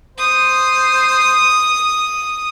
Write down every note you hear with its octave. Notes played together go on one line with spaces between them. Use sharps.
C5 D#6